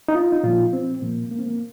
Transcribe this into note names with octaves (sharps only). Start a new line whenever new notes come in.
D#4
F4
D#4
A#2 F3 F4
C4
A#2 F3 A#3
A#3
C4
A#3